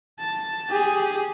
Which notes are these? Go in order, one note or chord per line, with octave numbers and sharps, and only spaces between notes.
A5
G4 G#4